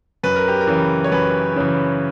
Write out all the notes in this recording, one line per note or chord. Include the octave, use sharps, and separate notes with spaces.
F#2 B4
A#4
G4
A#4
C#3 E3
C#5
F#2 B4
C#3 E3